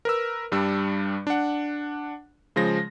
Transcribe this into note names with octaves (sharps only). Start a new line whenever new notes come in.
A#4 B4 E6
G2 G3 D4 E6
D4 F#5
C#3 F3 G#3 A#6